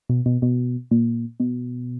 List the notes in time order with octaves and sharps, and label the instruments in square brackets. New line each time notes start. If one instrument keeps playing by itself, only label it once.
[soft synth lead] B2
B2
B2
A#2
B2